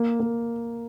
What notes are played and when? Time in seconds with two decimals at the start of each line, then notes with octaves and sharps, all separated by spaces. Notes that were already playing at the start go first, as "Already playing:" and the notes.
Already playing: A#3
0.20 A#3